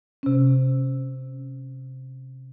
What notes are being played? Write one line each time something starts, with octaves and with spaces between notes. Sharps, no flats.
C3 C#4